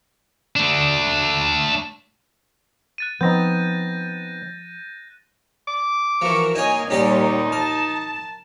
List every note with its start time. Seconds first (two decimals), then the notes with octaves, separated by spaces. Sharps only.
0.56 A3 D4
2.98 F#6 A6 D#7
3.21 F3 B3 C4 D#4 G6 A#6
5.67 D6
6.22 E3 F3 F#4 A#4 C#6
6.55 A#3 D#4 C#5 D#5 G#5
6.90 D#2 A#2 G3 C#4 D#4 G4 D5
7.52 A#4 A5